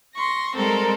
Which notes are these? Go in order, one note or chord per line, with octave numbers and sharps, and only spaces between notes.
C6 C#6 A#6
G3 G#3 C4 A4 A#4